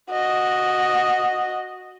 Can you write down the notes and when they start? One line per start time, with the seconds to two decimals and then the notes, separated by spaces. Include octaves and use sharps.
0.11 F#4 D#5